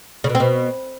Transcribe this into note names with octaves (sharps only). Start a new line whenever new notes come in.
C#3
B2
C4
B2